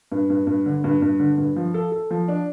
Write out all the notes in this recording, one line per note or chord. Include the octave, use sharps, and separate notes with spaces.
G2
G2
G2
D3
G2
G2
D3
G2
F3
A4
A4
F3
D4